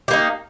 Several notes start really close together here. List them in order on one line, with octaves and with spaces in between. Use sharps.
G4 A#3 D#4